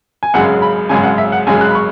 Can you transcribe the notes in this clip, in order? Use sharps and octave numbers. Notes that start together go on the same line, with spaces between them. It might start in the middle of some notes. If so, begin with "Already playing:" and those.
G#5
G#1 F#2 C#3 G#3 F#5
B5
G#1 F#2 C#3 G#3 G#5
F#5
E5
F#5
G#1 F#2 C#3 G#3 G#5
F#6
B5
C#6